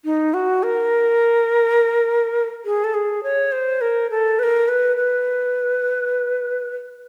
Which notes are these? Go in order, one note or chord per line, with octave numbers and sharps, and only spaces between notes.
D#4
F#4
A#4
G#4
A4
G#4
C#5
C5
A#4
A4
B4
A#4
B4
B4